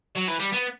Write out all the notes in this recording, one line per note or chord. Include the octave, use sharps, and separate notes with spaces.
F#3
E3
G3
B3